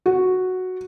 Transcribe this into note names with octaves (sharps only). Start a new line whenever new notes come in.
F#4